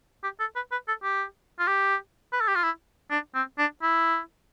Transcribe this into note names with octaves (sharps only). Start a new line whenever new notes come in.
G4
A4
B4
B4
A4
G4
F4
G4
B4
A4
G4
F4
E4
D4
C4
D4
E4